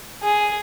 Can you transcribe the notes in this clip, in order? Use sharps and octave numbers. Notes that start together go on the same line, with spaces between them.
G#4